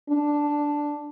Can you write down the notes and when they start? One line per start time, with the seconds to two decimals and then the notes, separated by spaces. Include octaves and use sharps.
0.09 D4